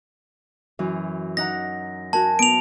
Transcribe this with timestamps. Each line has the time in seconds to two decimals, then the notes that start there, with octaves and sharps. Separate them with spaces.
0.79 F#2 E3
1.37 D#4 F#5 A#5 A#6
2.13 F#4 A#4 G#5 A5
2.39 B3 D7 F7